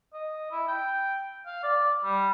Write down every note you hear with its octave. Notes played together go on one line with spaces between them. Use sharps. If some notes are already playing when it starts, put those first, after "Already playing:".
D#5
E4
G5
F5
D5
G3